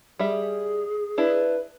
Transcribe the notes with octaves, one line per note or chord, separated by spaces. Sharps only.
G3 G#4 E5
D4 E4 B4